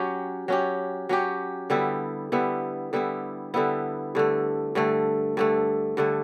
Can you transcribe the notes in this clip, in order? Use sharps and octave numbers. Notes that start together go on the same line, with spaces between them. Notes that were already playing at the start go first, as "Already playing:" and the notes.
Already playing: F#3 C#4 G4
F#3 C#4 G4
F#3 C#4 G4
D3 G3 B3 E4
D3 G3 B3 E4
D3 G3 B3 E4
D3 G3 B3 E4
G2 D3 A3
G2 D3 A3
G2 D3 A3
G2 D3 A3